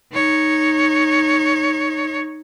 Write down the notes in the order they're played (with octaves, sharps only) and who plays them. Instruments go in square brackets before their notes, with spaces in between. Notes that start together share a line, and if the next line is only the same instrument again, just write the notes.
[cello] D#4 C#5